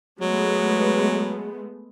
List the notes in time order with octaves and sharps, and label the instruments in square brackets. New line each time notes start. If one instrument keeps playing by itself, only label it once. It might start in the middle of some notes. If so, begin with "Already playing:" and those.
[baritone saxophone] F#3 [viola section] G#3 A3 B3